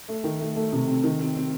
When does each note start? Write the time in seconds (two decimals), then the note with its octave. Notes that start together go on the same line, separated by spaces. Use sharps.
0.08 A3
0.24 D#3
0.40 A3
0.56 A3
0.73 C3
0.87 C4
1.03 D#3
1.20 C4
1.35 C4